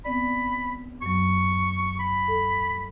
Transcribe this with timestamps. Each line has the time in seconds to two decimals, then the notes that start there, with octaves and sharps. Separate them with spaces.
0.05 B3 C4 D5 B5
1.02 F#2 F#3 C#6
1.99 B5
2.28 A4